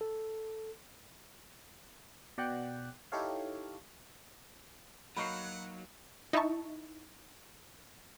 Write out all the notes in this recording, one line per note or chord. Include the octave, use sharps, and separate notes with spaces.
A4
B2 D5 F#5 G5 F#6
D#4 E4 G4 A4 C#5 F5
F#3 A#3 D#4 F#4 F#5 B5 C#6 C7
D#4 E4 D#5 E5 A5 C#6